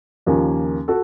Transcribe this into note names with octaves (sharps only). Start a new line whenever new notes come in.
D#2 C#3 F3 A#3 C#4
F#4 A4